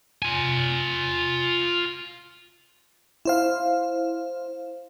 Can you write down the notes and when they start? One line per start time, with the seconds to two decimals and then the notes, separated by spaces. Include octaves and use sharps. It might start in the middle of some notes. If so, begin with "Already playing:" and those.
0.22 F4 G#5
3.25 E4 C5 F5